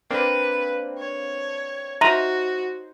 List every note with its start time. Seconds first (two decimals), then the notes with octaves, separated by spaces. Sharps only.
0.11 A#3 C4 D4 B4
0.98 C#5
2.01 D#4 F#4 C5 E5 A#5 C6 D#7